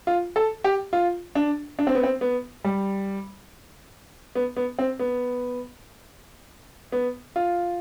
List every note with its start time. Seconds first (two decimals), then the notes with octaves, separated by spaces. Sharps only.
0.07 F4
0.36 A4
0.64 G4
0.93 F4
1.35 D4
1.79 D4
1.87 C4
1.95 B3
2.03 C4
2.21 B3
2.64 G3
4.35 B3
4.57 B3
4.79 C4
4.99 B3
6.92 B3
7.36 F4